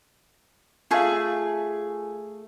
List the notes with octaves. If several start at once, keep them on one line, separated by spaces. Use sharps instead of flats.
A3 F4 G#4 E5 F5